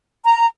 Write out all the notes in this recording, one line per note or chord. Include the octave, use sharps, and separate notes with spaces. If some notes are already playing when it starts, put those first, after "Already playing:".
A#5